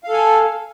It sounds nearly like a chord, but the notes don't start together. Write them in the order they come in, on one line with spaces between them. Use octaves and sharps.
F5 A4 G#5